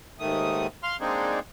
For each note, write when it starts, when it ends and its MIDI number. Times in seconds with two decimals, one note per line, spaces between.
0.19 0.67 39
0.19 0.67 44
0.19 0.67 51
0.19 0.67 57
0.19 0.67 87
0.83 0.97 77
0.83 0.97 84
0.83 0.97 89
1.01 1.39 56
1.01 1.39 58
1.01 1.39 60
1.01 1.39 62
1.01 1.39 63
1.01 1.39 68